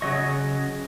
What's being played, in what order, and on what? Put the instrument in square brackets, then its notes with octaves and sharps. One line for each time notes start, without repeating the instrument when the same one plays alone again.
[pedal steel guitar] C#3 F#3 D#5 C#6